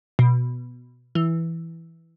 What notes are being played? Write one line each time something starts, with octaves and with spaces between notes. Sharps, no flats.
B2
E3